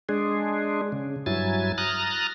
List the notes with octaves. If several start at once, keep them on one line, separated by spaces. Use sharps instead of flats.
G#3 D4 G#4
C#3
G2 F#3 E4 G#5 A6
A#5 D#6 F6 F#6 A6